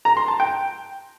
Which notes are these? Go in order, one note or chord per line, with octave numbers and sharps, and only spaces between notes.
A#5
C6
A5
G5